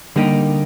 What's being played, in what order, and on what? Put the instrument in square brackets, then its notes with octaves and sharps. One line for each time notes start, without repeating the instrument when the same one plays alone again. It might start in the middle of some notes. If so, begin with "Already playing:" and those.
[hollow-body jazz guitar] D3 G3 A#3 D#4 G4